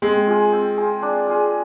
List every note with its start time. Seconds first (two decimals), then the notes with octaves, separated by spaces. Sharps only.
0.02 G#3 C4
0.27 F4 G#4
0.53 C4
0.77 F4 G#4
1.02 D4
1.27 F4 G#4